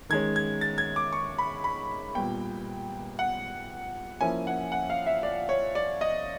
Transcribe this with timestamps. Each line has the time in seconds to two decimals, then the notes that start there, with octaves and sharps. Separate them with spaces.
0.09 D#3 G#3 C#4 G#6
0.36 G#6
0.61 A6
0.78 G#6
0.96 D6
1.13 C#6
1.38 B5
1.64 B5
2.15 A#2 G3 B3 G5
3.19 F#5
4.21 F3 A#3 C#4 E4 G#5
4.47 F#5
4.72 F#5
4.90 F5
5.07 E5
5.23 D5
5.49 C#5
5.75 D5
6.01 D#5